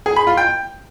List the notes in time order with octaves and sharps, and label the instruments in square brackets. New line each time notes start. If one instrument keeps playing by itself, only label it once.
[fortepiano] G#4
B5
F4
G5